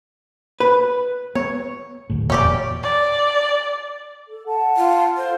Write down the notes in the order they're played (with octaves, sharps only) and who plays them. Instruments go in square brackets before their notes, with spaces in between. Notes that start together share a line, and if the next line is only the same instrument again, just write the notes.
[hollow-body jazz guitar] B4
[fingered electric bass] B3 [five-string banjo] C#5
[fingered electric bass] D2 A2
[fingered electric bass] F1 E2 A#2 [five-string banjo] C#4 G4 D5
[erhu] D5
[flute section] A4
F#5 A5
[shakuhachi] F4
[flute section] F4 A4 [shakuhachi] C5